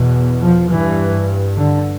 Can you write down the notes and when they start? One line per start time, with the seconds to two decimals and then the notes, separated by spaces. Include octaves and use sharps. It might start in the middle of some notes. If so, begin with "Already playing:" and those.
Already playing: E2 B2
0.41 F3
0.70 G2 E3
1.57 D3